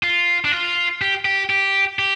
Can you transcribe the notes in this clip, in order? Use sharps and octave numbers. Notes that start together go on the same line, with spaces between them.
F4
D4
F4
G4
G4
G4
G4